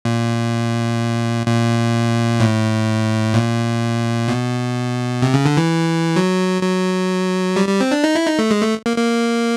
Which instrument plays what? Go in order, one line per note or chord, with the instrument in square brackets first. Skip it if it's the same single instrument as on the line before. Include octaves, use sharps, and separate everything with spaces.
[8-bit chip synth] A#2
A#2
A2
A#2
B2
C3
C#3
D3
E3
F#3
F#3
G3
G3
C4
D4
D#4
E4
D#4
A3
G#3
A3
A#3
A#3